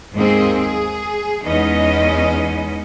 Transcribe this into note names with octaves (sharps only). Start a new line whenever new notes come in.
D#2 G#2 A#3 C4 G#4
G#4
E2 G#3 B3 C#4 D#4 D#5